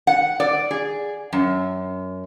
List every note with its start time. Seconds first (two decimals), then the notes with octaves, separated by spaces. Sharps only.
0.07 F#5
0.40 D5
0.71 G#4
1.33 F#2